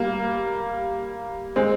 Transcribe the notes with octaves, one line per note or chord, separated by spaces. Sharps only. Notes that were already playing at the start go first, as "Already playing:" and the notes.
Already playing: G3 A#3
G#3 C4